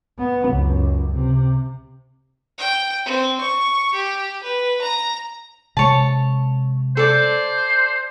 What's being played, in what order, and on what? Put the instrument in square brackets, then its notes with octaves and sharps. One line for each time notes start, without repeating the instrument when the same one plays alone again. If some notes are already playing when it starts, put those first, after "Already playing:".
[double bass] B3
C#2 F#2
C3
[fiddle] G5
C4
C#6
G4
B4
A#5
[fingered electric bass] C3 G#3 [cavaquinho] C#5 A5
[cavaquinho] A4 D5 [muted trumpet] C5